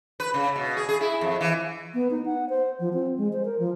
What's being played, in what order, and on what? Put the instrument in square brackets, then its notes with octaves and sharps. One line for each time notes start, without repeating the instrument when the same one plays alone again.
[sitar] B4
C#3
B2
G#4
G#4
E4
F2
E3
[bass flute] B3
D#4
F#5
C5
F3
C4
G#3
C5
A#4
F3